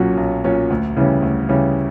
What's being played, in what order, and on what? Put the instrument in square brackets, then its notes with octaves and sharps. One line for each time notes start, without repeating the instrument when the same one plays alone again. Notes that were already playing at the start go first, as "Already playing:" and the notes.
Already playing: [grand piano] B1 A#2 F#3 C#4 F#4
B1
A#2 F#3 C#4 F#4
D2
C#3 E3 G3 C#4
D2
C#3 E3 G3 C#4